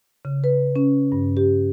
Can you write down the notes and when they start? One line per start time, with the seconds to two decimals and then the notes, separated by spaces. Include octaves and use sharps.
0.25 C#3
0.44 B4
0.76 C#4
1.12 G2
1.37 G4